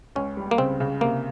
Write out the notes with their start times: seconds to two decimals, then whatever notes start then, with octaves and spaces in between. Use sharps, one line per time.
0.16 C#2 C#4
0.37 G3
0.51 A#3
0.58 C#3 C4
0.80 C#3
1.01 C3 A#3